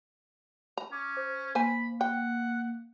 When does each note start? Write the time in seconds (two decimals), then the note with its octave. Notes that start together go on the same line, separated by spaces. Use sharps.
0.77 A#5
0.92 C#4 D6
1.17 C5
1.55 A#3 C5 G#5 B5
2.01 F#5 G5